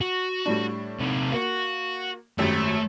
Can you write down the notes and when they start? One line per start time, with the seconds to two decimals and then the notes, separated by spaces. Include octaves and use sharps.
0.01 F#4
0.46 A2 G3 D4
1.00 C3 D#4
1.32 A#3 F#4
2.38 G#1 F#2 A3 G4